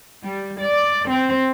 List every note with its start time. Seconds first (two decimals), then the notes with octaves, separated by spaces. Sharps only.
0.24 G3
0.61 D5
1.10 C4